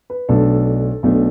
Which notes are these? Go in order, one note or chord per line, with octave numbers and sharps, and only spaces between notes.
B4
B1 B2 A3 D4 A4
B1 B2 A3 D4